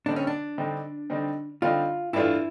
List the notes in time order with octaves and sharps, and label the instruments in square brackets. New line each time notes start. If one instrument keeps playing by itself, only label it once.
[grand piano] D3 G3 C4 D#4 [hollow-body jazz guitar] D4
[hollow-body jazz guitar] C#4
D4
[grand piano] D3 G3 C4 D#4
D3 G3 C4 D#4
[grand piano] D3 G3 C4 D#4 [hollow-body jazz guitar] F4
[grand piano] G2 E3 A3 D4 F4 [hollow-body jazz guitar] E4